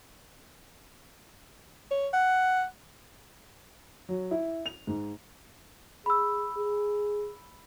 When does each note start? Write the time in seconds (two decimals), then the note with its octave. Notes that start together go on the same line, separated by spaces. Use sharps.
1.91 C#5
2.13 F#5
4.09 F#3
4.31 E4
4.66 F7
4.87 G#2
6.06 G#4 B5 E6
6.57 G#4